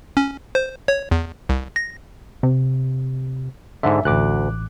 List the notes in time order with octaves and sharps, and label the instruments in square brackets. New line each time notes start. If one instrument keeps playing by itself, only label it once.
[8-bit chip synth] C#4
C5
C#5
E2
C2
A#6
[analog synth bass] C3
[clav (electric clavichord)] G#2 D3 [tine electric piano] E5
[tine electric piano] A1 D6 F#6 [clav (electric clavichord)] D2